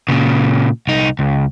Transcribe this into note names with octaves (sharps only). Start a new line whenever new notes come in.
A#2 C#3
C2 D#4
C#2